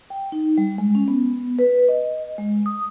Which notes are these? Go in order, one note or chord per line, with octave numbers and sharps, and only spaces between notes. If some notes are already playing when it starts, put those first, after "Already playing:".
G5
D#4
G3
G#3
C#4
B3
B4
D#5
G#3
D#6